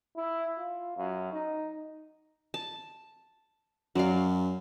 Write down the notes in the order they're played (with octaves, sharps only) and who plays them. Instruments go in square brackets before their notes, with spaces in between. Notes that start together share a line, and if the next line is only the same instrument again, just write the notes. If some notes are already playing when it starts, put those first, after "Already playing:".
[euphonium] E4
F4
F#2
D#4
[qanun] A5
[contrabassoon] F#2 [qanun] F#3 D5 F5